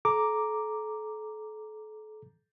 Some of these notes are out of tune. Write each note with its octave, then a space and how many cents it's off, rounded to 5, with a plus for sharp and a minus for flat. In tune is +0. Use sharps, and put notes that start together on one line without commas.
A4 -35 A#5 +0 D6 +0